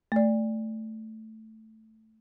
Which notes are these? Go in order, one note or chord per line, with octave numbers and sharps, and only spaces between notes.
A3 D5